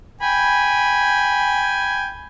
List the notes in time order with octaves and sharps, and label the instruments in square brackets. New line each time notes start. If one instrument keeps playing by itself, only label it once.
[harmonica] G5 G#5 [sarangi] B5